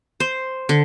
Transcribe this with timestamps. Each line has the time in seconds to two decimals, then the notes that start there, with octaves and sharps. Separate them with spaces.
0.20 C5
0.69 D3